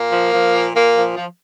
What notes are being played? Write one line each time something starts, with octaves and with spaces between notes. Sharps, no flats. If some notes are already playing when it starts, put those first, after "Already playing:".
Already playing: A#2 A#3
F3
F3
A#2
A#2 A#3
F3
F3